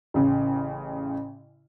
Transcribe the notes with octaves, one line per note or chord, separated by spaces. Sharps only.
A1 C#3